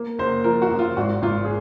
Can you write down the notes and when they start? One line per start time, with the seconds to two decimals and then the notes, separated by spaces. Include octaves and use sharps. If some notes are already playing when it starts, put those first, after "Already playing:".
Already playing: A#3
0.19 F#1 C5
0.44 F3 A#4
0.62 F#4
0.71 F#2
0.79 F4
0.97 G#1 F#4
1.22 G#1 F4
1.45 G#4